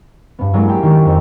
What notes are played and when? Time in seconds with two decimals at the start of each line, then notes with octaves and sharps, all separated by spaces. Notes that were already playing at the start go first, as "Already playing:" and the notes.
0.39 G2 B3
0.53 F#3 G#3 A#3 E4 D5
0.69 G4 D5 G5
0.83 D#3 A#3 G4 C#6
1.05 F2